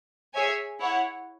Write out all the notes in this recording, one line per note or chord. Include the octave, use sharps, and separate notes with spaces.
G#4 C#5 E5 G#5
E4 C#5 F#5